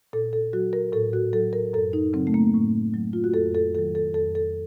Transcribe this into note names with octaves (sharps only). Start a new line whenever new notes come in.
A#2 A4
A4
F#3 F#4
A#4
A2 A4
F#4
F#3 A4
A#4
F#2 A4
D#4
C#3 F#3 C4
A3
A#3
A2
F#3
F4
F#4
F2 A4
A4
D#3 F#3 A4
A4
F2 A4
A4